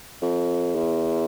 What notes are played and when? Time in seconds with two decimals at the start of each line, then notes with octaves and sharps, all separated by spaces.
0.22 F2
0.76 E2